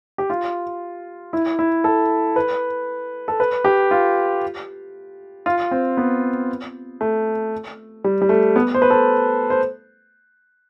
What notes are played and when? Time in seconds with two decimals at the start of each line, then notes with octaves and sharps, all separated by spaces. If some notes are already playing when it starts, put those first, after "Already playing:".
0.18 G4
0.30 F4
1.33 E4
1.59 E4
1.84 A4
2.36 B4
3.28 A4
3.40 B4
3.65 G4
3.91 F4
5.46 F4
5.71 C4
5.97 B3
7.01 A3
8.04 G3
8.22 G3
8.29 A3
8.56 B3
8.74 C5
8.82 B4
8.90 A4
9.50 C5